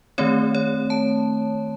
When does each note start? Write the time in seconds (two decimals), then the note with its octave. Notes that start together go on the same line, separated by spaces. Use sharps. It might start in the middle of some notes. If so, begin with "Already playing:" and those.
0.18 D#3 A3 C4 C#5
0.55 C#5
0.90 A5